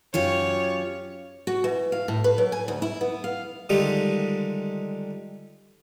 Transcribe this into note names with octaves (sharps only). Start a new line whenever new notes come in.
F#2 F4 G4 C#5
F#4
E3
F5
A2
B4
F#3
G#5
D2
E4
B3
F5
D3 D#3 G3 G#3 F4 G4